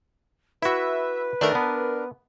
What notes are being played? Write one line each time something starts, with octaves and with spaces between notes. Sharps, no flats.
E4 F#4 B4 E5
D#3 A3 D4 A#4
B3